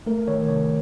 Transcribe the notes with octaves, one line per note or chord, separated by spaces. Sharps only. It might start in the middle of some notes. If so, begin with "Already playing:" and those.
A3 A#4
D#3 C#5
C3 C#5